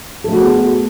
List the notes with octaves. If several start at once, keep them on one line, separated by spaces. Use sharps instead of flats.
A3 B3 F#4 G#4 A4